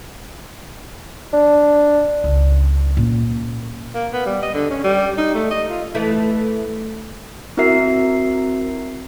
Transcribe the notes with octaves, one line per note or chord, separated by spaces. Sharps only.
D4
C#2
A#2 C#4
A#3
B3
G3
D#5
D3
C#4
G3
D#4
A3
D#5
F4
E3 A3 E4
C4 E4 F#4 A#4 E5 C7